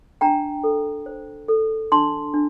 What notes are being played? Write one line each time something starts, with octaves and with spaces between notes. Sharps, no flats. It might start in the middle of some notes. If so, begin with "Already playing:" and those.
D4 G5 A#5
A4
C5
A4
D4 A5 C6
D4